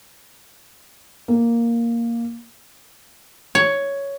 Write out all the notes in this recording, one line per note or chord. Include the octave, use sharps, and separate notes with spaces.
A#3
C#5